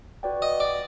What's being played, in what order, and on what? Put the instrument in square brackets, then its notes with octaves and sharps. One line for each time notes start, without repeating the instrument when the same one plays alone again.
[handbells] F#4 B4 D5 G5
[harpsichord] D#5
D5